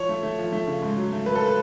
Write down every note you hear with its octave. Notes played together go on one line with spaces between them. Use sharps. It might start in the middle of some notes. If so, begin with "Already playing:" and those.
Already playing: F3 C#5
A3
A3
F3
A3
C#3
G#2
F#3
A3
F#3 B4
A4
B4